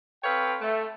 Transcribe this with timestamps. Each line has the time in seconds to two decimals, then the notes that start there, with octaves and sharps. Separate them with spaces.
0.23 C4 A4 B4 C#5 F5 G5
0.61 A3